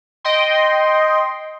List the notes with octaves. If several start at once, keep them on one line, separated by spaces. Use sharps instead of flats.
D#5 G5 C6